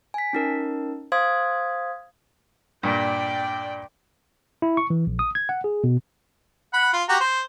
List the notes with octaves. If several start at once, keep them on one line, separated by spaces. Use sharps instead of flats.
G#5 B6
C#4 D#4 A#4
C5 F5 C6 D#6 G#6
G2 A#2 D5 G5
E4
C#6
E3
A#1
D#6
G#6
F#5
G#4
B2
F#5 B5
F4
F#4 G4 A#5
C5